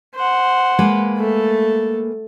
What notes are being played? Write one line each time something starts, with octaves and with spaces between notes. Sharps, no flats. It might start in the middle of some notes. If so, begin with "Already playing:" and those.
C5 F#5
G#3 A#3 B4
A3 A4